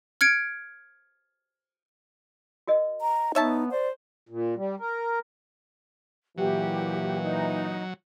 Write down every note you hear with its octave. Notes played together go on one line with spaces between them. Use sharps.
F6 G#6 C#7 D7
F#4 A#4 D#5
A#5
B3 D#4 C#5 E5 A5
C5 D5
A#2
G3
A#4
A#2 E3 F#3 G4
D#4